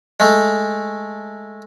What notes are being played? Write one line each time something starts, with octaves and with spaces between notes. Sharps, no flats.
G#3 A3